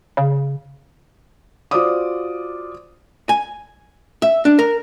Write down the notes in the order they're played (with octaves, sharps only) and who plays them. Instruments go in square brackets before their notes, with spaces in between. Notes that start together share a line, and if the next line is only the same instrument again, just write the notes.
[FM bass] C#3
[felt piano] F4 F#4 C5 D5 D6 D#6
[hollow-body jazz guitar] G#5
E5
D4
A#4